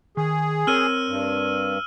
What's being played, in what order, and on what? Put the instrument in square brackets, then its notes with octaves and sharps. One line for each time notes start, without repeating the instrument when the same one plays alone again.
[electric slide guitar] D#3 [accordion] G#4
[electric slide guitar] C4 A#4 C#5 [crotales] E6 F6 D#7
[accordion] G2